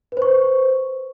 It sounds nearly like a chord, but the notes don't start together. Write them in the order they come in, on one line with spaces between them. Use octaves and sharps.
B4 C5 C#6